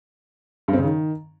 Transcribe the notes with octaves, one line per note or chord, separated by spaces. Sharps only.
G2
C4
C#3
D#3